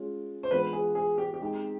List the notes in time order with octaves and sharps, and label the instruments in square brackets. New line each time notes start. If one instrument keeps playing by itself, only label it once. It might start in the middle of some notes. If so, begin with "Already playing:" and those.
Already playing: [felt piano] G#3 C#4 F4
[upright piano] C5
[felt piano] E3 G#3 B3 D4 F4 [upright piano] B4
[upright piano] G#4
G#4
G4
G4
[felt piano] G#3 C4 D#4